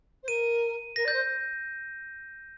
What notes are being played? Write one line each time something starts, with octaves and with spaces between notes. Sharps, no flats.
C5
A#4 D#7
A#4 A#6
D5
G6
C5